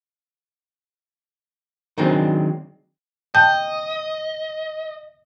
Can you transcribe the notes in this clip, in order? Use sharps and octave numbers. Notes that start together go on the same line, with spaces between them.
D#3 F#3 G#3 C4 D4
D#5 G5 A5 G6